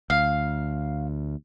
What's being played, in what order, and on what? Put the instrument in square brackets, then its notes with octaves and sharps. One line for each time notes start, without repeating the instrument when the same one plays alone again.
[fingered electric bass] D2 [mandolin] F5